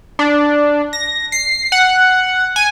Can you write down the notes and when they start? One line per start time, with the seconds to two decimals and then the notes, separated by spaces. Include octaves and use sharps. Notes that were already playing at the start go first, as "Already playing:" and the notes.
0.19 D4
0.93 A#6
1.32 C7
1.72 F#5
2.56 G#5